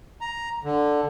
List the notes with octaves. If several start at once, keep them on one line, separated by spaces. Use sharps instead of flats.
A#5
D3